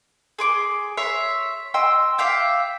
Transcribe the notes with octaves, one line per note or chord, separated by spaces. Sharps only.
G#4 C6 D6
C#5 E5 C6 C#6
D#5 G5 C6 E6
E5 F5 G5 D6